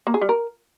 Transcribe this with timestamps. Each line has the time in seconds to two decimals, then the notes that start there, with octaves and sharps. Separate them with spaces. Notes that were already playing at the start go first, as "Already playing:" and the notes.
0.07 A#3
0.14 G#4
0.21 G3
0.29 A#4